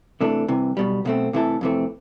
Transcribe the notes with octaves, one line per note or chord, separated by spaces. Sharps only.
C3 E3 A3 D4
C2 C3 E3
B1 B2 G3
B1 B2 A3 C4
C3 E3 A3 E4 A4
F2 C3 E3 A3 C4